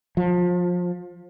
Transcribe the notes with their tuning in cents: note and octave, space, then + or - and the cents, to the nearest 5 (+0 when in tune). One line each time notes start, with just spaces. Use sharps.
F3 +25